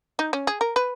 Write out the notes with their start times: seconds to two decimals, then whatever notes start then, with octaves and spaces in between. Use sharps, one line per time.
0.19 D#4
0.33 C#4
0.47 G#4
0.61 A#4
0.76 B4